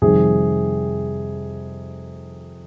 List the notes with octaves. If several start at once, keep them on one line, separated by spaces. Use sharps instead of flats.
F2 C3 D#3 G3 G#4